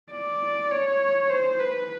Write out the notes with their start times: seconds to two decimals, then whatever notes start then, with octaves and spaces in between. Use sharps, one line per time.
0.12 D5
0.71 C#5
1.30 C5
1.60 B4